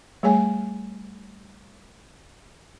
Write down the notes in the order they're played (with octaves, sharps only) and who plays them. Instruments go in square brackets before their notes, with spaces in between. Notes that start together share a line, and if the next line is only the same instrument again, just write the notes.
[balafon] G3 A3 G#4 C#5 G#5